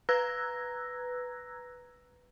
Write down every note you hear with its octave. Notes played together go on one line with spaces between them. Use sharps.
B4 A#5 E6 F#6 G#6 A#6